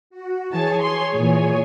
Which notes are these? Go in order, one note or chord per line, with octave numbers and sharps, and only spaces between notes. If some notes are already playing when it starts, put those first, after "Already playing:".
F#4
E3 G#4 C#5 G#5 A5
C6
A#2 E3